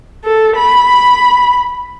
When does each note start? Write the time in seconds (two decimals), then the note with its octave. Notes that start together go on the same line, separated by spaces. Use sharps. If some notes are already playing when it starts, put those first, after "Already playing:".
0.24 A4
0.56 B5